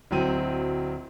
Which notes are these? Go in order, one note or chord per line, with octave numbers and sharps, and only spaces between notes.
D1 F#3 C4 D#7